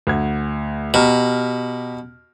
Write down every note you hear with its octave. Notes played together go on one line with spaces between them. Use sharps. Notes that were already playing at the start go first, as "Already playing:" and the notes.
D2 F#5 G#6
B2 G4 A#5 F6